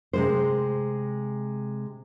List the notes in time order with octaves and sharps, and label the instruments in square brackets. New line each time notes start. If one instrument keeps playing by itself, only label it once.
[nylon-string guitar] C3 G#3 C5